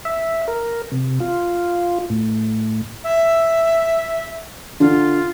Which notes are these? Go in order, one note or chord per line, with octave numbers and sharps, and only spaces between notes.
E5
A#4
C3
F4
A2
E5
D3 F4